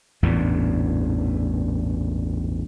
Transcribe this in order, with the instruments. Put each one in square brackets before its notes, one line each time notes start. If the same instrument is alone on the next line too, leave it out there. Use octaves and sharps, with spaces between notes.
[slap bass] A1 E2 G2 A#2